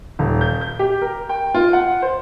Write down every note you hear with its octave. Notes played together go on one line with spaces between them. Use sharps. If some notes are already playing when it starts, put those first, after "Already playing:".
D#1
G6
G6
G4
A#4
G5
F4
F#5
C5